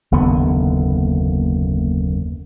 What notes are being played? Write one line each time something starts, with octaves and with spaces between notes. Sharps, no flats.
F#1 D#2 D3 B3